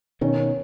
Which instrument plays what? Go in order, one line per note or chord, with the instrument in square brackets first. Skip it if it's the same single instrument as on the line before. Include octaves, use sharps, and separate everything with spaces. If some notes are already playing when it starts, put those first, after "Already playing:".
[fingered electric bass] B2 D#3 [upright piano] C#4